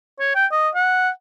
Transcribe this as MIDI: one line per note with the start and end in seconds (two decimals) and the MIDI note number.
0.20 0.34 73
0.35 0.46 79
0.52 0.69 75
0.75 1.09 78